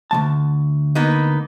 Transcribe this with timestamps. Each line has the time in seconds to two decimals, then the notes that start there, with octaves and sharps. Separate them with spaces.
0.11 D2 F3 A5
0.95 A#3 B3 D#4